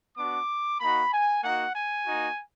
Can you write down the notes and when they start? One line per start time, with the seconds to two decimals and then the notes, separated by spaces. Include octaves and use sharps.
0.17 B3 D4 F#4 D6
0.80 A#3 D#4 F#4 B5
1.13 G#5
1.43 A#3 D#4 F#4 F#5
1.76 G#5
2.06 A#3 D#4 F#4